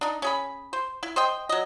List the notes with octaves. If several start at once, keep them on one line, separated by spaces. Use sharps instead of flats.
D4 D#4
C#4 G#4 B5
C5
E4
C5 D#5 G5
F#3 D#5